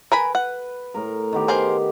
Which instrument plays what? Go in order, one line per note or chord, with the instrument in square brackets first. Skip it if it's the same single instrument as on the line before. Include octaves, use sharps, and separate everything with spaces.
[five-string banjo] A#4 G#5 B5 [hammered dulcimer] B4
[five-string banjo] F#5
[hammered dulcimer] A2 A#4
D#3 B3 G4
[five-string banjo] G#4 A#4 C5